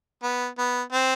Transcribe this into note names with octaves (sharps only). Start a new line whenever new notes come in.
B3
B3
C4